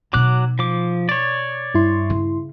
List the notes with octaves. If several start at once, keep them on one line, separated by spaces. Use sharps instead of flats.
B2 F#3 D#4 D6 F#6
F3 D6
C#5 D5
G2 E4 C6
C#3